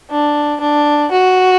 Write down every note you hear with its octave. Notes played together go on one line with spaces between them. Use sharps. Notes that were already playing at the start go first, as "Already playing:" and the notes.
D4
D4
F#4